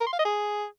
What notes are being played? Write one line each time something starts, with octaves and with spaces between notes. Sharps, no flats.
A#4
C6
F5
D#5
G#4